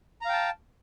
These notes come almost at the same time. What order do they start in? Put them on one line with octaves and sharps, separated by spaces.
A#5 F5 G5 A5